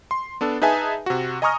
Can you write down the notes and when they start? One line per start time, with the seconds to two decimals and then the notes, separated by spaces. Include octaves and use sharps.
0.11 C6
0.41 B3 D4 A4
0.62 D#4 G#4 B4 E5 G#5 A5
1.06 C3 F#4
1.42 D#5 G#5 A#5 C#6 D#6 F6